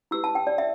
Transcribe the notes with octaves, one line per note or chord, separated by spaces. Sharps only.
E4 G4 B4 E6
A5
G5
D5
E5